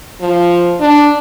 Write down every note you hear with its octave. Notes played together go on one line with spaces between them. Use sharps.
F3
D4